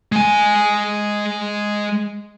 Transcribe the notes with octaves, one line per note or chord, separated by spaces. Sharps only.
G#3 G#5